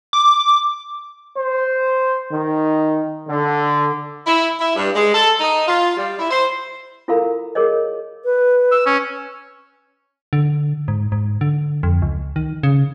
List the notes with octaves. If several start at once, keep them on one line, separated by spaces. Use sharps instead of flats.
D6
C5
D#3
D3
E4
E4
G2
G#3
A4
D#4
F4
G3
E4
C5
E4 F4 A4 A#4 F5 B5
G#4 A#4 C#5 D#5
B4
E6
C#4
D3
G#2
G#2
D3
F2
C#2
D#3
C#3